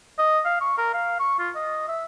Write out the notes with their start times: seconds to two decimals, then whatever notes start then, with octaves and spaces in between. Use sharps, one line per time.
0.19 D#5
0.45 F5
0.61 C#6
0.78 A#4
0.94 F5
1.19 C#6
1.39 F4
1.55 D#5
1.88 E5